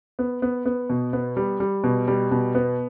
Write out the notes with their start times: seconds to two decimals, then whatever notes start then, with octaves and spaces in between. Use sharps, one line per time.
0.19 B3
0.42 B3
0.66 B3
0.90 B2
1.13 B3
1.37 G3
1.60 G3
1.84 B2
2.08 G3
2.31 B2
2.55 B3